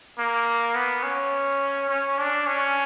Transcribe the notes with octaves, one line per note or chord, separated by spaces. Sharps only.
A#3
B3
C#4
C#4
D4
C#4